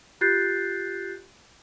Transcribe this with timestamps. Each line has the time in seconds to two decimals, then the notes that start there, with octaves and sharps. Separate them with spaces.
0.21 F4 G4 F#6 G6 A6 C7